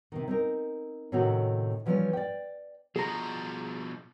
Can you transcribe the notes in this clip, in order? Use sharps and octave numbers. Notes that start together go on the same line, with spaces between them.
C3 D#3
C4 D#4 A#4
A2 C3 D#3 C#4 D#4 F#4
E3 F3 G3 A3 C#4
D5 G5
B2 F3 G#4 A#5